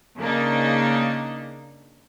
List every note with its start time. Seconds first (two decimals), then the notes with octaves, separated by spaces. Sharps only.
0.18 C#3 A#3 D4 D#4